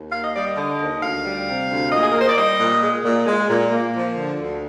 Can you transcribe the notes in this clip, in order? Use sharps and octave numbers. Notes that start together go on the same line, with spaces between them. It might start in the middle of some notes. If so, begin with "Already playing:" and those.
Already playing: D#2
A#3 F5
D#5
G3 D5
D#5
D3
D#2
D2 F5
G3
C3
D2
A#2 D#5
G#4
A#3 A#4
C5
D5
G3 D#5
A#2
G#3
A#2
G#3
A#2
A#3
F3
D3
D2